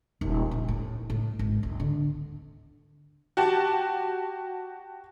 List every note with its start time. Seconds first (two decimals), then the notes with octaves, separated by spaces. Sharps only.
0.21 D#1
0.51 A#1
0.68 A2
1.10 A2
1.39 G#1
1.63 D1
1.80 D3
3.37 F#4 G4 A5